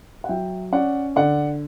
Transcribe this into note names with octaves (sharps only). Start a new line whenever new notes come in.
F#5
F#3 E5 G5
C#4 D5 F#5
D3 D5 F#5